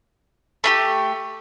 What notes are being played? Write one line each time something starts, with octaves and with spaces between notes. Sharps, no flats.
A3 E4 G4